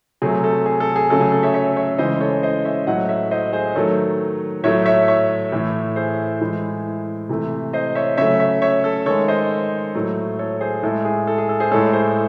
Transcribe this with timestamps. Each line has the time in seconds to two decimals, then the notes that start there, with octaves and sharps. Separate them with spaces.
0.22 C3 F#3 A3 G#4
0.44 A4
0.66 G#4
0.80 A4
0.96 G#4
1.10 C#3 F#3 A3 A4
1.21 G#4
1.32 A4
1.43 C#5 E5
1.54 C#5 E5
1.77 C#5 E5
1.98 C#3 E3 G#3 C5 D#5
2.21 A4 C#5
2.43 C5 D#5
2.65 C#5 E5
2.87 A2 F#3 A3 D#5 F#5
3.09 C#5 E5
3.31 C5 D#5
3.53 G#4 C5
3.75 D#3 F#3 A3 A4 C#5
4.63 A2 F#3 A3 C#5 E5
4.86 C#5 E5
5.08 C#5 E5
5.52 A2 E3 A3
5.96 G#4 C5
6.41 A2 E3 G#3
7.29 C3 E3 A3
7.73 C5 D#5
7.95 C#5 E5
8.17 C#3 F#3 A3 C#5 E5
8.39 C#5 E5
8.62 C#5 E5
8.84 A4
9.06 D#3 G#3 A4 C#5
9.28 C5 D#5
9.95 A2 F#3 A3
10.39 A4 C#5
10.61 G#4 C5
10.83 A2 G#3 A4
11.05 G#4
11.27 A4
11.38 G#4
11.49 A4
11.60 G#4 C5
11.71 A2 G#3 A4 C#5
11.93 G#4 C5